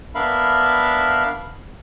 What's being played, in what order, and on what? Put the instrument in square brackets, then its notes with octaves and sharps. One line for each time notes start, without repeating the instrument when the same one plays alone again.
[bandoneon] B3 D4 A#4 E5 F5 B5